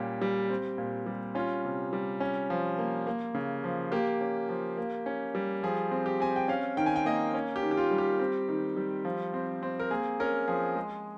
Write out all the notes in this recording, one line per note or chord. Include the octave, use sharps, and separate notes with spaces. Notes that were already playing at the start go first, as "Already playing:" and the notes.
Already playing: A#2 G3 C#4 G4
G3
C4
A#2
G3
C#4 F4
C3
G3
C#4
F3
A#3
A#3
C#3
F3
A#3 G4
C#4
F3
A#3
C#4
G3
F3 G#4
C4
G4
C4 G#5
G5
C#4 F5
D#3 G5
G#5
G5
A#3 D#5
C#4
G4
D#3
G4
F4
G3
G4
C4
D#3
G3
F3
C4
C4
A#4
A#3 G#4
C#4 A#4
F3 G#4
G#3